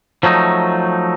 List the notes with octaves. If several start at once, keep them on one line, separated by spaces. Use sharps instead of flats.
F3 F#3 A3 D#4